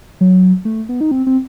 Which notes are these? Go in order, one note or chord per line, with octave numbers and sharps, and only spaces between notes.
F#3
A3
B3
D#4
C4
C4